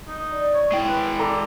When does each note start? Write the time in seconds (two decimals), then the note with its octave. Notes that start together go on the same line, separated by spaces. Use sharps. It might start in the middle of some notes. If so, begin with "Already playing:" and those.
0.08 D#4
0.31 D5
0.54 C#5
0.72 G#3 E4 G5
0.88 B4
1.19 A4 D5 A#5